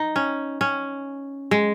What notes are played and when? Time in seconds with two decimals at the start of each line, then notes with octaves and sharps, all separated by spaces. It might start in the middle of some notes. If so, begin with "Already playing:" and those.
Already playing: D#4
0.16 C#4
0.61 C#4
1.51 G#3